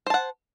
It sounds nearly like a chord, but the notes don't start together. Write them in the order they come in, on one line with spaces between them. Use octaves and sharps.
C5 A5 F#5